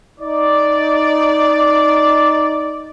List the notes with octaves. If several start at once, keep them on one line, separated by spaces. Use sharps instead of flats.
D#4 D5